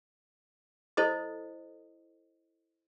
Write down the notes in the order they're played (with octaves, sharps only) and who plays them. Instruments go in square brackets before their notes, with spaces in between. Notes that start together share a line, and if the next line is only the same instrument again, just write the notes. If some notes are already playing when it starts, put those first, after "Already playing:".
[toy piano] E4 A4 C5 D#5 D#6